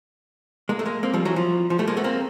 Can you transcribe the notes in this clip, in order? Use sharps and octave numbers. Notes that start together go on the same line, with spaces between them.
G#3 A#3
A3
G#3 A#3
A#3 C4
F3 G3
E3 F#3
F3
F3
G3 A3
G#3 A#3
A3 B3
A#3 C4